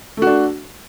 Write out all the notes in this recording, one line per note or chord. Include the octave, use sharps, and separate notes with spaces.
A3 D4 F#4